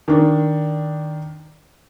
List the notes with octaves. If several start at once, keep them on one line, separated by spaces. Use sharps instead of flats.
D#3 D4